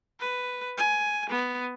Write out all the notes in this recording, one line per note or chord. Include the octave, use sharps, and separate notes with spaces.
B4
G#5
B3